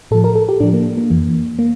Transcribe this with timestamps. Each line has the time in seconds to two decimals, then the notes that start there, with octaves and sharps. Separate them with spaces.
0.11 A2 F3 A4
0.24 A#4
0.35 A4
0.49 G4
0.60 A2 F3 D4
0.73 A#3
0.97 A#3
1.10 F2 E3
1.59 A#3